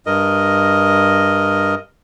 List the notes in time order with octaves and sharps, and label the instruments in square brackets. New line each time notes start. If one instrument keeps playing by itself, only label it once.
[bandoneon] G2 A#4 D#5